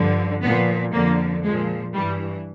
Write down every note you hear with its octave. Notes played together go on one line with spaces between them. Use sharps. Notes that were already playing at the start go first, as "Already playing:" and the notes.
Already playing: G2 D3 F3
A#2 F3 B3
F2 D3 F3 A#3
A#2 F3 G#3
G2 E3 G3